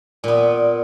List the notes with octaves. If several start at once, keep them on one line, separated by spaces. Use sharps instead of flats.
A#2 B3